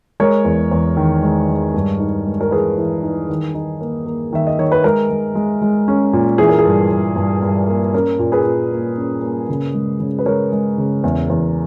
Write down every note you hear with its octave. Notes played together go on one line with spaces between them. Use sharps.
G#3 A#4 C#5
E2
E2
D#3
G#3
G#3
G2
D#4
G#3
A#4
E3 G#4 B4
E3
D#4
D#3
D#4
A#3
A#3
D#3 E5
D#5
D#3 C#5
B4
G#3 A#4
G#3
G#3
G#3
C#4
A#2
E3 G#4
A#4
G#4
G2
G2
G2
G2
A#3
C#4 A#4
A#2
G#4 B4
A#2
A#3
C#4
A#3
C#3
G#3
C#3
B4
G#3 A#4 C#5
G#3
C#3
E2
E2